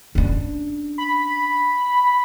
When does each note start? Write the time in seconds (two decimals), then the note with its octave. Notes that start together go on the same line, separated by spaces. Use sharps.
0.15 C#4 D4
0.98 B5